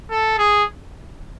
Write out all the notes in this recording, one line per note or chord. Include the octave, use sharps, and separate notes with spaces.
A4
G#4